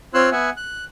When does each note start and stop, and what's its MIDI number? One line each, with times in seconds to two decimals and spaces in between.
0.14 0.30 60
0.14 0.30 65
0.14 0.30 73
0.14 0.30 84
0.14 0.30 88
0.14 0.30 90
0.32 0.50 59
0.32 0.50 76
0.32 0.50 78
0.32 0.50 80
0.57 0.84 90